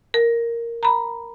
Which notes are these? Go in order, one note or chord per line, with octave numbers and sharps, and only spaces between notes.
A#4
A#5 B5